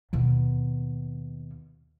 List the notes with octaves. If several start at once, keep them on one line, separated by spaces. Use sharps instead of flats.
D#2 B2